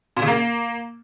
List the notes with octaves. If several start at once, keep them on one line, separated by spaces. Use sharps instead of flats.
A#2
C#3
A#3